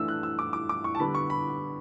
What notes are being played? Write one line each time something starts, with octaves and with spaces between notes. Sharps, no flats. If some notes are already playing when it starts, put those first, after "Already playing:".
Already playing: E3 A3 D4 E6
F#6
E6
D6
D6
D6
C#6
A5
D3 G3 B3 D4 B5
C#6
B5